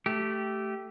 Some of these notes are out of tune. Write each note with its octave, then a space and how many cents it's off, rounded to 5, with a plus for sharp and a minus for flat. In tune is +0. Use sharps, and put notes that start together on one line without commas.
A3 +0 G4 -10